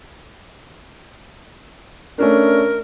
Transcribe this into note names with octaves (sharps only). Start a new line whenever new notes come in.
A3 C#4 D4 A#4